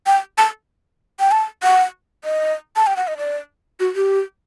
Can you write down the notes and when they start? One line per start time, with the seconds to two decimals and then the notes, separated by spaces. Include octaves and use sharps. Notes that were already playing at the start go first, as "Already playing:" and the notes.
0.07 G5
0.38 A5
1.20 G5
1.32 A5
1.63 F#5
2.24 D#5
2.76 A5
2.87 G5
2.97 F#5
3.08 D#5
3.18 D5
3.80 F#4
3.96 G4